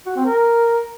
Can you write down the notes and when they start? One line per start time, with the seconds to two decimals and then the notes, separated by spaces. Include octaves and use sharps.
0.06 F#4
0.16 C4
0.26 A#4